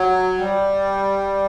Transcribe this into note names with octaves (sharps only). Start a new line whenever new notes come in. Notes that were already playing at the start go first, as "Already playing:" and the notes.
Already playing: F#3
G3